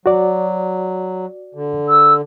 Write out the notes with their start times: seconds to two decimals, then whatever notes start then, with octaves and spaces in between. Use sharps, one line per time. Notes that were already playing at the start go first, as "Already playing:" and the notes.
0.06 F#3 F#4 D5
1.55 D3
1.89 E6